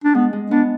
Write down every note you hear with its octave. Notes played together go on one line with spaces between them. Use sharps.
D4
G#3 B3
G#3
B3 D4